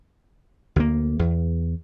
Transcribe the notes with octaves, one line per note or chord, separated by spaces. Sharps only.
D2 A#3
E2